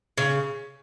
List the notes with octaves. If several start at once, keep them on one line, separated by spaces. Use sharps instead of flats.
C#3